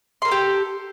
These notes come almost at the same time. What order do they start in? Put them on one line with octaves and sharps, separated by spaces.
C6 A#4 A4 G4